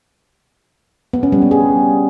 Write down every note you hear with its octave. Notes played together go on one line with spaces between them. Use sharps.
B3
C#4
G3
B3
G#4